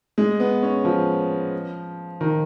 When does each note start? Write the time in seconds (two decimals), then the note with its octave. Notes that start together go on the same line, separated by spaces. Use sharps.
0.18 G#3
0.40 B3
0.63 C#4
0.85 F3
2.21 D#3